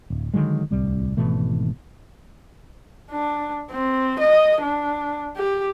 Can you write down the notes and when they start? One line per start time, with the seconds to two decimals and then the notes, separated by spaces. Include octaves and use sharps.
0.10 D1
0.34 D3 D#3 F#3 G#3
0.71 D1 C2 G3
1.17 G#1 B2 E3 A3
3.11 D4
3.71 C4
4.20 D#5
4.62 D4
5.37 G4